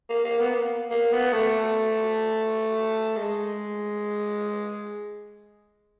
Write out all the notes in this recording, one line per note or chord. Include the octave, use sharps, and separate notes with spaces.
A#3
A#3
B3
A#3
A#3
B3
A3
G#3